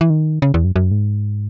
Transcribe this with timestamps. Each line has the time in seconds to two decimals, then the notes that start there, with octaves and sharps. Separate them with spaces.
0.01 E3
0.10 D#3
0.42 C#3
0.54 E2
0.64 F#2
0.76 F#2
0.91 G#2